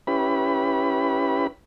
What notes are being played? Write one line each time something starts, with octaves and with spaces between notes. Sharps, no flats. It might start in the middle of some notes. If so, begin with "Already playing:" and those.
C#4 E4 G4 B4 B5